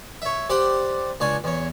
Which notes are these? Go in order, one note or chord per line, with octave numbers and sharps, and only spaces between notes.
C#5 E5
G4 C5 D5 F#5 G5
C#2 D4 C#5 G#5
E2 C#5